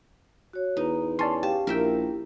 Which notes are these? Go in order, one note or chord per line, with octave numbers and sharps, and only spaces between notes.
F#4 C#5
E2 D#4 B4
C#4 D5 A5 C6
G4 F5 A5
A#1 E4 A#4 E5 G5